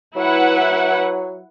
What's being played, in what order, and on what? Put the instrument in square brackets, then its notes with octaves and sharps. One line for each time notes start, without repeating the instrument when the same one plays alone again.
[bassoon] F#3 [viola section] E4 B4 F#5